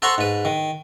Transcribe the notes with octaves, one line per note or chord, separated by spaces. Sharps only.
A4 C5 F#5 A#5 C6 C#6
G#2 B4
D#3